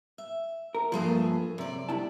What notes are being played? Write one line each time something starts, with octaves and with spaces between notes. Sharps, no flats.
E5
A#4
G2 F3 A3 A#3 G#4
F#2 C3 D5
C2 E4 A5